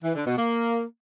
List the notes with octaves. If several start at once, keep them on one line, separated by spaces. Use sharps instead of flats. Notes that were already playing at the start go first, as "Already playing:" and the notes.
E3
D3
B2
A#3